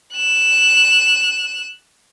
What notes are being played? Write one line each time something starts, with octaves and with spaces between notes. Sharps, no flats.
F#6 E7